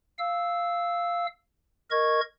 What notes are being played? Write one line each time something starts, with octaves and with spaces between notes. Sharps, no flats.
F5 E6
A#4 D#5 C#6 G#6